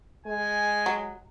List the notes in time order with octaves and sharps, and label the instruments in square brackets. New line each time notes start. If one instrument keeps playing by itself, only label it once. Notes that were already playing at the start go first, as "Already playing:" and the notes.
[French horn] G#3 [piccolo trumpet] G#5
[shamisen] F#3